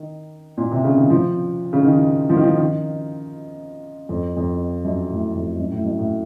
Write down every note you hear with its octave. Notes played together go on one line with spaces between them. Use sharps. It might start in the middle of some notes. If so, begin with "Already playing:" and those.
Already playing: D#3
A#2
C3
C#3
D#3
F3
C#3
D#3
F3
D#3
F3
D#3
F2
F2
F#2
A2
F2
F#2
A2
F#2
A2